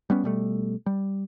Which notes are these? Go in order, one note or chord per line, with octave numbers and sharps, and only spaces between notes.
G3 B3 C#4
B2 G3 A3
G3